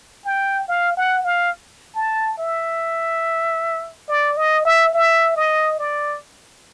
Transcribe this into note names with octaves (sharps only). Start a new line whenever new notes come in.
G5
F5
F#5
F5
A5
E5
D5
D#5
E5
E5
D#5
D5